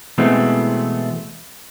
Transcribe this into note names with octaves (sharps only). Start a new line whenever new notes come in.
B2 E3 G#3 A3 B3 C4